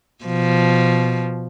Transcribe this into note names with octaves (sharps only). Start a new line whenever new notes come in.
B2 F3